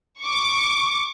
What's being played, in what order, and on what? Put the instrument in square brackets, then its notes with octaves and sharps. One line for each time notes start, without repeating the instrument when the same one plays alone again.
[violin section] C#6 D6